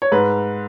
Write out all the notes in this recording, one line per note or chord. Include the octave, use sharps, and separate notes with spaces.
C#5
G#2 B4